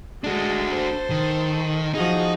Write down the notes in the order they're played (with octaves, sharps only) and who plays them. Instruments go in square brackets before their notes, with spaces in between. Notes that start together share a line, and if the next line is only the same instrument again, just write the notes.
[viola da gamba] G#3 A4 [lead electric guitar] D4 F#4
[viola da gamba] A4 C5
[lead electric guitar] D#3
[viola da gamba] F3 F#4 G#4 [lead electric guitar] D#4